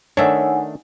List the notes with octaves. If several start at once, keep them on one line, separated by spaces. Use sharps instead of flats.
D#3 A3 D4 D#4 C#5 E5 F#5 G#5